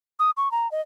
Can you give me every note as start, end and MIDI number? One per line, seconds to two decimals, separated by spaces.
0.19 0.30 87
0.37 0.51 85
0.51 0.70 82
0.71 0.81 75